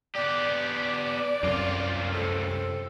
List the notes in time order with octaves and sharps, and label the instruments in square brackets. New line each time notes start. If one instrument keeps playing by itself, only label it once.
[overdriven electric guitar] B3 G4 [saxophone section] D5
[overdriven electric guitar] C2 F4 [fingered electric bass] F#2 C3
[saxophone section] C4 A4